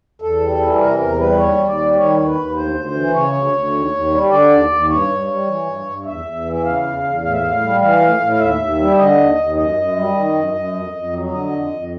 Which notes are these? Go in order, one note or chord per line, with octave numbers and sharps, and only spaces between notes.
E2 A4
G3
E3
C3 A#4
E2 A#4
G3 B4
D#2 C#5
D#2
D5
G3
D#3 C#5
D#2
B4
D#2
D2 C5
D2
C5
E3
C#3 C#5
D2
D2
D#2
D#2
G3
D3 D5
D#2
D#2
G2 C#5
G2
G3
E3
G2
G2
E2 E5
E2
E3
E5
C#3 F5
E2
E2
A2 F5
E5
A2 F5
G3
E3 F5
A2
A2
F5
D#2 E5
D#2
G3
D3 D#5
D#2
D#2
F#2 D#5
F#2
G3
D#3
F#2
F#2
F2
F2
F#3
D3 D#5
F2
F2